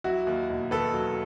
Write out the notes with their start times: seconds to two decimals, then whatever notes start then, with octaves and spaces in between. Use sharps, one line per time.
0.04 F#3 E4 F#4
0.27 D#2
0.49 E1
0.71 D#3 A4 B4
0.94 F#3